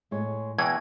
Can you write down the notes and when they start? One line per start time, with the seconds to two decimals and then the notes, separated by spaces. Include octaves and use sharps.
0.11 A2 G#3 C#5
0.58 E2 B2 E3 G5 G#6